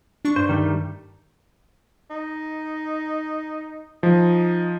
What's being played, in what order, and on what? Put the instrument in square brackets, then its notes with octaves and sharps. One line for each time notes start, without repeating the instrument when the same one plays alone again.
[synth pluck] D4 C#6
[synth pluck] G2 [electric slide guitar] C5
[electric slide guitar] D#3 G3 A3
[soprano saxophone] D#4
[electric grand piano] F3 [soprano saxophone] D#4